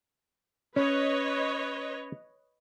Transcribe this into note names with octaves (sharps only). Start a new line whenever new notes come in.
C#4 B4 C#5 D#5